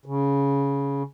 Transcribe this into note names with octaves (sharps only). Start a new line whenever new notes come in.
C#3